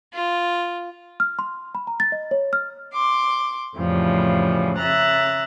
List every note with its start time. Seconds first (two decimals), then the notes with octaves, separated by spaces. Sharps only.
0.14 F4
1.20 F6
1.39 C6
1.75 B5
1.87 A#5
2.00 A6
2.12 D#5
2.31 C#5
2.53 F6
2.92 C6 D6
3.76 F2 A2 C#3 E3 F3 G3
4.77 C#3 E5 A#5 F#6 A6